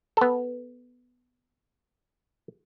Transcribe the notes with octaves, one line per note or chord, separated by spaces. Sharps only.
B3 A4